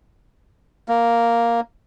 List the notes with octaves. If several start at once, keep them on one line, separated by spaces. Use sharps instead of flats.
A#3